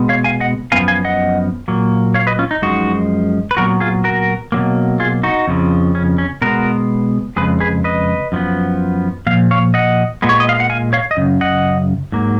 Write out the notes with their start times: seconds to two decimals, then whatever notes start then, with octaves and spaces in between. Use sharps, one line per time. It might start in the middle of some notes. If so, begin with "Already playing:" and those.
Already playing: B2 G#3 B3
0.09 C#5 F5
0.24 F5 G#5
0.40 D#5 F#5
0.72 F#2 F3 B3 F5 G#5
0.88 F5 G#5
1.04 D#5 F#5
1.68 A#2 F#3 A#3
2.14 C#5 F5
2.27 B4 D#5
2.39 C#4 F4
2.51 D#4
2.62 F#2 F3 G#3 D#4 F#4
3.51 B4
3.57 A#2 F#3 B3 F#4 A#4
3.80 F4 G#4
4.04 F#4 A#4
4.52 B2 F#3 A#3
5.00 F4 G#4
5.23 D#4 F#4
5.48 F2 C#3 F3
5.95 C#4
6.18 C#4
6.42 B2 G#3 B3 F#4 A#4
7.36 F2 C#3 G#3 G#4 B4
7.60 G#4 B4
7.84 B4 D#5
8.32 F#2 F3 B3
9.27 A#2 F3 F5
9.51 C#5 F5
9.74 D#5 F#5
10.22 A#2 G#3 B3
10.29 C#5
10.40 D#5
10.49 F5
10.60 F#5
10.70 F5 G#5
10.93 C#5 F5
11.11 D#5
11.17 F#2 C#3
11.41 D#5 F#5
12.12 G#2 F#3 A#3